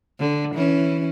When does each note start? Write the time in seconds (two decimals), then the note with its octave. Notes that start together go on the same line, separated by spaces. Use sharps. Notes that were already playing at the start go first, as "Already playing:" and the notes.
0.19 D3
0.55 E3 C#4